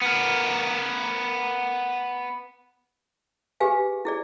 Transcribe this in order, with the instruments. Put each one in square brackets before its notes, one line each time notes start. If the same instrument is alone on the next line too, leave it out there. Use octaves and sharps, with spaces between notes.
[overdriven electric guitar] B3 A#4
[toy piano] G4 G#4 B4 F5 G#5
E4 G#4 D5